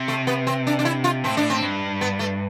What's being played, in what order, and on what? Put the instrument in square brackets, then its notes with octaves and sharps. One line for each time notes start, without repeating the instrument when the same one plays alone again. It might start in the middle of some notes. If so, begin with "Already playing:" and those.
Already playing: [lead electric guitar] C3
[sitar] A3
B3
C4
D4
D4
E4
F4
[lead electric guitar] A2 [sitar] C4
[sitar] D4
C4
[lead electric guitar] G2
[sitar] B3
A3